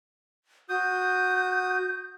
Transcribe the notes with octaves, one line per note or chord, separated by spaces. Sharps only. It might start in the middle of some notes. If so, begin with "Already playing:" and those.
F#4 D#6 G6